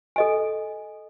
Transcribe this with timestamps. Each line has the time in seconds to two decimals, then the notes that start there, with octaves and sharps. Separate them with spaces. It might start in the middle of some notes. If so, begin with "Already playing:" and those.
0.16 A4 D#5 G#5